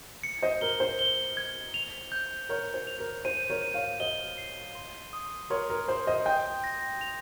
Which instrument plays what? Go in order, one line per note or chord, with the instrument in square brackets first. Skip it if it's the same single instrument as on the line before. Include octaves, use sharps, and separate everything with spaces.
[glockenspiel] C#7
[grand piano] C5 D#5
[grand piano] A#4 [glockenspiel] G7
[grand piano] C5
[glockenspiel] G7
G#6
F7
G6
[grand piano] A#4 C#5 [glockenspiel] G6
[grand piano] C5
[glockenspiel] F7
[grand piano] A#4
[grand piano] C5 [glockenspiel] D#7
[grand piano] A#4 C#5
[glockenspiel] D#7
[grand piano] C#5 F5
[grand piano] C5 D#5 [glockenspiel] G7
[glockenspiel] C7
C6
D#6
[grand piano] A#4 C#5 [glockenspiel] C6
[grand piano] A#4
[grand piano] C5 [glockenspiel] C6
[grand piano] C5 D#5
[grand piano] D#5 G5 [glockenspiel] G6
[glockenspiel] A#6
F7